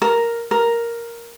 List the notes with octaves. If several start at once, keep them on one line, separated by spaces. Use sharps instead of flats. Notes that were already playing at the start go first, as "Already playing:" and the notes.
A#4
A#4